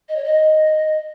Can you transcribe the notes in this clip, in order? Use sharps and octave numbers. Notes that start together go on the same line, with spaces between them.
D#5
C#5
D#5